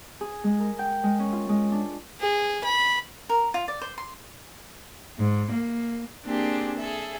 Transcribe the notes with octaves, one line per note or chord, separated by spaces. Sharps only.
G#4
G#3
A#4
G5
G#3
C#4
F4
G#3
D4
G#4
B5
A#4
F4
D5
C5
C6
G#2
A#3
A#3 C4 D4 G4 G#4
G#4 A4 E5